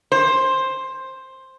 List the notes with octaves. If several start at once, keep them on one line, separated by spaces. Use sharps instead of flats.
C5